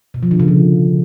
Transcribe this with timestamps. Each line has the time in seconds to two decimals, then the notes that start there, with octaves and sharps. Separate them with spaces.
0.14 B2
0.23 F3
0.31 D3
0.39 C#3
0.48 F3